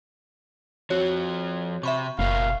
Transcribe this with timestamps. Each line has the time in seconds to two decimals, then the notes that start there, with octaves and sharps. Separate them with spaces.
0.90 F3 C4 F#4 C#5
1.83 C3 E5 B5 C#6
2.19 F#1 B2 A#3 F5